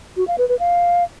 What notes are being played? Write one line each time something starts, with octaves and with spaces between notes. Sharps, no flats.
F#4
F5
B4
B4
F5